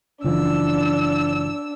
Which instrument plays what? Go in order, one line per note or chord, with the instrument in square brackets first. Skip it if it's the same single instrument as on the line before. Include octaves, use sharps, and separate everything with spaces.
[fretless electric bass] F#1 E3 F3 [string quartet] D4 E6